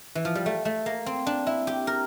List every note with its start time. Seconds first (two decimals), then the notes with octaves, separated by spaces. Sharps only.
0.15 E3
0.25 F3
0.35 G3
0.46 A3
0.65 A3
0.86 A#3
1.06 C4
1.26 D4
1.47 E4
1.67 G4
1.87 A#4